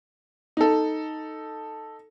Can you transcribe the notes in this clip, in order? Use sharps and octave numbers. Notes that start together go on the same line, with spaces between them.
D#4 A4